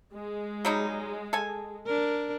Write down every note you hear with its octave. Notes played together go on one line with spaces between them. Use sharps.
G#3
F#3 G3 D#4
A4 G#5
D4 A#4